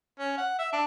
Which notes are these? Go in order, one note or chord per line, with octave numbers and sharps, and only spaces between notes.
C#4
F#5
E5
D4